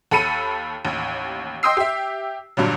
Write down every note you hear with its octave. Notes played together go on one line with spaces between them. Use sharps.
D#2 A4 B5 C#7 D#7
A1 D#2
D#5 G5 C6 D#6 E6 C7
G4 E5
G2 A#2 D3 F#3